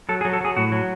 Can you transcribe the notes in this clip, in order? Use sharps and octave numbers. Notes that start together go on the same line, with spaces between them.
F#3 A4
G#4
F#3
A4
F#3 G#4
A2 F#4
F#3